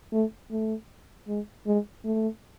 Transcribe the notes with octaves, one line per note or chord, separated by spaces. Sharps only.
A3
A3
G#3
G#3
A3